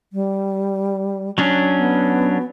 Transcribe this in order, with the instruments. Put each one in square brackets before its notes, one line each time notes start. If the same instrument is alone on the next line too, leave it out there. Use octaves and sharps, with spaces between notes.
[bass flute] G3
[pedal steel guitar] F#3 C#4 D4
[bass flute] B3